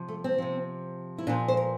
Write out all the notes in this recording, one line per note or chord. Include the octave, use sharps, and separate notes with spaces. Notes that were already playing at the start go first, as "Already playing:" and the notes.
Already playing: C3 F3
A3
C4
C3 F3
E4
A#2 F3 D4
C5
A#4